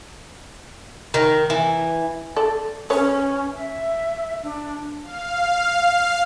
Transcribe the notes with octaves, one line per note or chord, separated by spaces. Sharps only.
D#3
E3
A4 D5
C#4 B4 C#5
E5
D4
F5